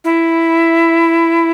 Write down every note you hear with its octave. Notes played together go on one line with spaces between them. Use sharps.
E4